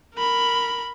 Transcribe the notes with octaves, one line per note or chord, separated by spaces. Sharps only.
A#4 B5